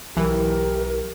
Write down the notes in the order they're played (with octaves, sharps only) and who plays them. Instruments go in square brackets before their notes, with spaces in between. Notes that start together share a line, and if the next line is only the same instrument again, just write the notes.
[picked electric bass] B1 F#3 [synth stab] E3 [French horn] G4 [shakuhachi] A#4